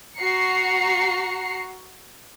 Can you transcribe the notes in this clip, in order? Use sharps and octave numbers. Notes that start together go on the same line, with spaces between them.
F#4 A#5 C7 C#7